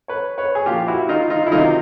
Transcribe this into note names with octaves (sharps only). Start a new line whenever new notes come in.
B4 C#5
B4 C#5
G#4
A#2 F3 F4 G4
E4 F#4
D#4 F4
D#4 F4
E4
C3 D#3 F#3 D#4 F4